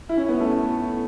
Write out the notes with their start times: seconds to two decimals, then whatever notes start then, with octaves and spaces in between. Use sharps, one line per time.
0.09 E4
0.17 C#4
0.29 B3
0.40 A3